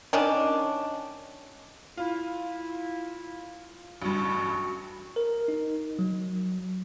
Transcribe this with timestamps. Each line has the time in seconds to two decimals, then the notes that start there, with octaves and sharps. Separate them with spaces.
0.13 D#3 C#4 D4
1.97 E4 F4
4.02 A1 G2 F#4
5.16 A#4
5.48 D#4
5.99 F#3